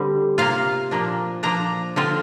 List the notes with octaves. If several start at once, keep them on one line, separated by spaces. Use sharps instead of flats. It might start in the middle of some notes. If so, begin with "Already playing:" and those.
Already playing: D3 G3 C4
C3 A#3 F4 F5
A#2 F3 A#3 D4
F3 A#3 D4 A#5
D3 F3 C4 F4